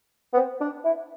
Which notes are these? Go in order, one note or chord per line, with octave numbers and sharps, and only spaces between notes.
B3
C4
D4
E4